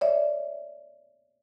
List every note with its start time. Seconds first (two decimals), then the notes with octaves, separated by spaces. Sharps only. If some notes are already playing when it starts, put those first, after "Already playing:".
0.01 C#5 D5 E5